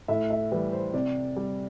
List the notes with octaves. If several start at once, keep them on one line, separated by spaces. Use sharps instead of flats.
A2 E5
E5
E3 G3 B4
C5
C3 D5
G3